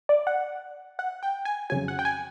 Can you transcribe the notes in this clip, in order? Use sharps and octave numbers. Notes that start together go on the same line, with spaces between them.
D5
F#5
F#5
G5
G#5
F2 C#3 F#3 G#5
F#5
G5
G#5